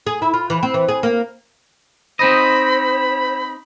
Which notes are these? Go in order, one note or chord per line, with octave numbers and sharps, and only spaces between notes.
G#4
E4
F4
E3
C4
E3
G#4
A#3
C4 D#4 C5 D#5 B5